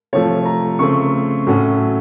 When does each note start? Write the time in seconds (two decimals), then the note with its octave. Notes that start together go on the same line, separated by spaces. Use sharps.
0.13 C3 F3 A3 C#5
0.45 A#5
0.79 C#3 A3 C4 C#6
1.47 A2 F#3 A3 C#4